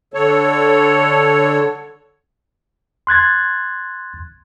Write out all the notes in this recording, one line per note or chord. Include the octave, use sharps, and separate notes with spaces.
D3 A4 C#5
C6 F#6 G#6 A6